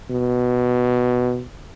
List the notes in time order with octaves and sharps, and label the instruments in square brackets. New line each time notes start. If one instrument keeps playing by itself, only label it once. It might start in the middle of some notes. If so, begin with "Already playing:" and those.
[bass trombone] B2